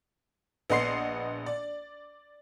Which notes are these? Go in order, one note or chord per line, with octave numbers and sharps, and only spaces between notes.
A#1 B3 D#5 F#5 C6 C7
D5